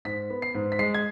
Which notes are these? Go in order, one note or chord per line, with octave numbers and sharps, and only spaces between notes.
G#2 B6
B3
C7
G#2
B6
G#3 C7
G#6